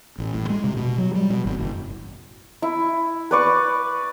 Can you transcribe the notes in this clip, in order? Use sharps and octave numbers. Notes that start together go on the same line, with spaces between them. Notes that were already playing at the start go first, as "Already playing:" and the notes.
A1
A2
G#3
C3
B2
F#3
G3
B2
G#1
F#1
E4
B4 D5 C#6